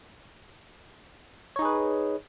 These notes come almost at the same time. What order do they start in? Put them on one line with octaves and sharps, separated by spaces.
C#5 D#4 G#4 B4